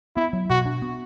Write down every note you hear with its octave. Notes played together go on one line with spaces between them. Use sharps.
B3 E4
F#3
B2 F#4
D4
B3